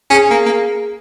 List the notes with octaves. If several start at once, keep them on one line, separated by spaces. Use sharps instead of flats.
C#4 G#4
A#3
A#3